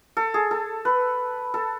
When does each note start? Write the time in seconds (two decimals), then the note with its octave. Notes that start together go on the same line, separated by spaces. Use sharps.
0.17 A4
0.34 G#4
0.51 A4
0.85 B4
1.54 A4